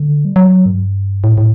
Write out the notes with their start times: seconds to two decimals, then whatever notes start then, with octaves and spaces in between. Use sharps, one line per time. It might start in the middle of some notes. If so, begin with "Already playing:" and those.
Already playing: D3
0.25 G3
0.36 F#3
0.66 G2
1.24 A2
1.38 A2